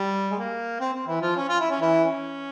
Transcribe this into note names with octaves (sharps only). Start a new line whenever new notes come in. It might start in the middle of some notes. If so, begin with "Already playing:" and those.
Already playing: G3
G#3
A#3
C4
C4
E3 E4
F3 F4
C#4
F4
E4
C#4
E3 E4
C#4